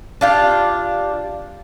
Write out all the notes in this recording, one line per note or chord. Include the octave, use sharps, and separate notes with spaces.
D4 F4 G4